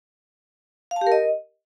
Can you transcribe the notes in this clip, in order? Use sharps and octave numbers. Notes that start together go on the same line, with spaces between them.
F5
A5
G4
A#4
D#5